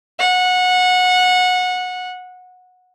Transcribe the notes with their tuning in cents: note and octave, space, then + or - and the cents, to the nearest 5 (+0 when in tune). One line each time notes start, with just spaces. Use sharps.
F#5 -20